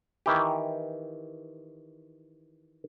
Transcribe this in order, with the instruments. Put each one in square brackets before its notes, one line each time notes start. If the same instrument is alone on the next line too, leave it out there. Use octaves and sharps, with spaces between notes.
[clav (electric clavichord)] D#3 E3 G4